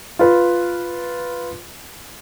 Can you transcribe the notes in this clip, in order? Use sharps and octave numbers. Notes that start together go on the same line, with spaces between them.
F4 B4